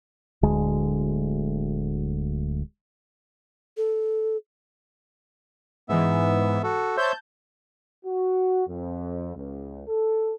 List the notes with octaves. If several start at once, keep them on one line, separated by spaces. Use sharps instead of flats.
D1 D2 D3 G#3
A4
G#2 E3 B3 E5
F#4 A4
C5 C#5 E5 A5 G6
F#4
F2
C#2
A4